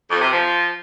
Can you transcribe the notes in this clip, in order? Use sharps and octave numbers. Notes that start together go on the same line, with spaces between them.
F2
C3
F3